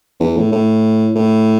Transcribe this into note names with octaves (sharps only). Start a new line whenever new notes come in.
E2
A2
A2
A2